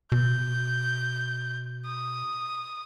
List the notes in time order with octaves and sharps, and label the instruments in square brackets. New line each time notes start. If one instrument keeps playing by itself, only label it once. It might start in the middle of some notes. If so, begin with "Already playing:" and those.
[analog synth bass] B2 [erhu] G6
[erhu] D#6